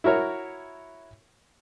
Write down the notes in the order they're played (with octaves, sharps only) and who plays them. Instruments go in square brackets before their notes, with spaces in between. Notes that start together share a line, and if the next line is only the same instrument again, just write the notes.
[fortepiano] E4 F#4 A#4 C#5